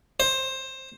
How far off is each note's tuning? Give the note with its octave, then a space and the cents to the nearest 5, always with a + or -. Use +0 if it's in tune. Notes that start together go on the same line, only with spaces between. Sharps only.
C5 +15